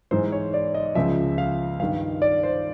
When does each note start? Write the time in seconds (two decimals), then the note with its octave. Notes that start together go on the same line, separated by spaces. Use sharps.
0.11 G#2 E3 C5
0.32 C#5
0.54 D5
0.75 D#5
0.95 C#2 C#3 F3 E5
1.38 F5
1.79 G2 D#3 F5
2.22 D5
2.43 C5